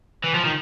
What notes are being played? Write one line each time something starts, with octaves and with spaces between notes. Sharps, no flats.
E3
F3
D#3